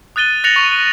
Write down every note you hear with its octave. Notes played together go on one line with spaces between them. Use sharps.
D#6 F#6 A6 D#7 G7
F#6 A6 A#6 C#7 F7 F#7
C#6 F7